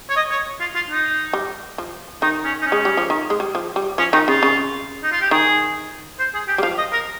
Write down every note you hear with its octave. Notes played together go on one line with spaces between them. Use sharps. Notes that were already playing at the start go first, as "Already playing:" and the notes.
C#5
D#5
C#5
F4
F4
D#4
G3
F3
D#3 D#4
C#4
D#4
C#4
G#3
G3
F3
D#3
G#3
G3
F3
G3
F3 C#4
D#3 D#4
C#3 F4
C#3
D#4
F4
G4
D#3 G#4
C5
G#4
G4
G3
F3 F5
D#5
A#4